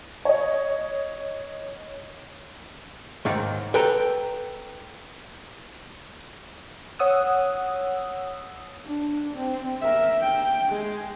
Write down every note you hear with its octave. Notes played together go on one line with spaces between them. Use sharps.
C#5 D#5
D#2 G#2 D#3
A4 B4 G5 A5 A#5
C#5 F#5 D#6 E6
D4
C4
A#4 E5
G5
G#3